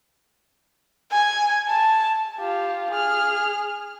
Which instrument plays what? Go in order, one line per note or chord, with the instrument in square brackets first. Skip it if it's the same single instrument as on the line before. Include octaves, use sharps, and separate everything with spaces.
[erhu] G#5
A5
[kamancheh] F4 G4
G#4 F6